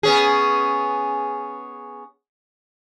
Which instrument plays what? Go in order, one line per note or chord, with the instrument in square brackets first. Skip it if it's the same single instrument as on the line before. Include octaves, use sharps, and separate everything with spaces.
[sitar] B3 C#4 G#4